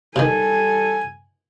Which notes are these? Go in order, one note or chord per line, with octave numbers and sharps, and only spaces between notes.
C3 D#3 G3 A4 G#5